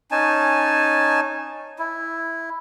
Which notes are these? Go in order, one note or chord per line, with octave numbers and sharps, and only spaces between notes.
C#4 D#4 G#5 A5
E4